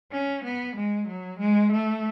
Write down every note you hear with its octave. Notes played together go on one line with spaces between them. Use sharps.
C#4
B3
G#3
F#3
G#3
A3